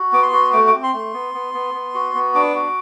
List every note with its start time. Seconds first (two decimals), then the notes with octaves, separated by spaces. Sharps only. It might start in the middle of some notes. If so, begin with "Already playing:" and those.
Already playing: F#4
0.12 B3 D6
0.23 C6
0.33 F#4
0.53 A3 D6
0.67 D6
0.73 C4
0.83 C6
0.93 A3
1.14 B3
1.34 B3
1.54 B3
1.74 B3
1.95 F#4
2.15 B3
2.35 D4 D6
2.55 F#4